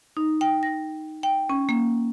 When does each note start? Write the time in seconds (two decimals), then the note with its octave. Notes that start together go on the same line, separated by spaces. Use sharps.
0.17 D#4
0.41 G5
0.63 A#6
1.23 G5
1.49 C#4
1.69 A#3